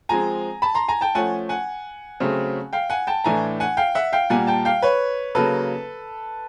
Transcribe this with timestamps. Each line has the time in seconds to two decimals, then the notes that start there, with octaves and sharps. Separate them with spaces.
0.09 F3 G#3 C4 G#5 A#5
0.62 A5 B5
0.75 A#5 C6
0.88 G#5 A#5
1.01 G5 A5
1.15 F3 A3 C#4 F#5 G#5
1.49 F#5 G#5
2.20 C#3 F#3 A3 C4
2.73 F5 G5
2.90 F#5 G#5
3.07 G5 A5
3.24 A2 E3 A3 D4 G#5 A#5
3.60 F#5 G#5
3.77 F5 G5
3.95 E5 F#5
4.13 F5 G5
4.30 A#2 G3 A#3 F#5 G#5
4.47 G5 A5
4.65 F5 G5
4.82 B4 C#5
5.35 C#3 F#3 A#3 A4 B4